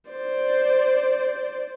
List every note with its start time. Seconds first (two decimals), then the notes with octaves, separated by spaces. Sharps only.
0.10 C5 D5